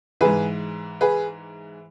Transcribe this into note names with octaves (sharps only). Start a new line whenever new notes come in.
G#2 E3 G#4 B4
G#4 B4